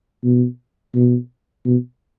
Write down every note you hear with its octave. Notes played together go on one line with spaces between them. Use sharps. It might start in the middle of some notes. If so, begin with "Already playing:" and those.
B2
B2
B2